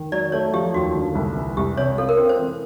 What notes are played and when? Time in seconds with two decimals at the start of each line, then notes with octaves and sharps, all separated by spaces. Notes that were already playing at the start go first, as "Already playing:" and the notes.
Already playing: D#3
0.12 F#3 D5
0.32 A3 C#5
0.53 F3 G4
0.74 D#2 F#4
0.95 D3
1.15 C2
1.36 E3
1.57 C2 G4
1.77 C3 C#5
1.98 F4 A4
2.09 A#4
2.18 C4
2.29 C5
2.39 E3